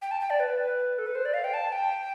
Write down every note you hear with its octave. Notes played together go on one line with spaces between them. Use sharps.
G5
A5
G5
D5
B4
A4
B4
C5
D5
F5
G5
A5
G5